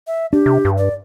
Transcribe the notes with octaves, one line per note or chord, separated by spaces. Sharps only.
E5
D4 G4
C3
G2
D5